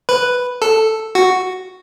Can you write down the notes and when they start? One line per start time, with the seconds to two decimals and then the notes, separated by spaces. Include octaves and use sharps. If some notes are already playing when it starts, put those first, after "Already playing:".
0.09 B4
0.62 A4
1.15 F#4